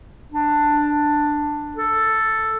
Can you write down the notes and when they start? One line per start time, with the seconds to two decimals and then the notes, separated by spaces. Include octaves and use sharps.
0.32 D4
1.77 A4